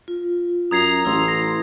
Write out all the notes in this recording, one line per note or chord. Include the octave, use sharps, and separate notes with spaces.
F4
F#2 A#5 D#6 G#6 C7
A1 E4 C6
A#6